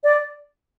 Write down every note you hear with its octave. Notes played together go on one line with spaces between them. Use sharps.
D5